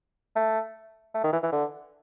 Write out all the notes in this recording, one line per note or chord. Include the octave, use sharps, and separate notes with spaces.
A3
A3
D#3
E3
E3
D3